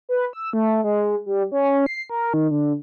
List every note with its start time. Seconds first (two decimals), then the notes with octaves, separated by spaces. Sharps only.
0.09 B4
0.33 E6
0.53 A3
0.84 G#3
1.26 G3
1.52 C#4
1.86 C7
2.10 A#4
2.34 D#3
2.51 D3